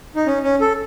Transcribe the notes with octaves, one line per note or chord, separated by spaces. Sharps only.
D#4
C#4
C#4
A4